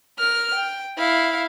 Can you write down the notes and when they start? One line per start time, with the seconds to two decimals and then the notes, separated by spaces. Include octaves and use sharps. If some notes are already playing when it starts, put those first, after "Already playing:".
0.19 A#4 F6
0.54 G5
0.98 E4 F5